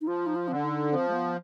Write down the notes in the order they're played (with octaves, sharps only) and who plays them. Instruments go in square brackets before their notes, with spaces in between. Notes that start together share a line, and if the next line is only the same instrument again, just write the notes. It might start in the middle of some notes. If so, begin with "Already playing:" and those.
[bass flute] D#4
[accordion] F3 [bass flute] F4
[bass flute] D#4
F4
[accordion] D3 [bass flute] C4
[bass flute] D4
D#4
[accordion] F3 [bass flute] C4
[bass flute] G#3
B3